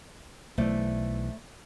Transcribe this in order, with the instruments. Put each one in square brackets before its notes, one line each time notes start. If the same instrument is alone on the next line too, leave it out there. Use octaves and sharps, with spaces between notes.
[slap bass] B1 E3 [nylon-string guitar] A3 C5 D5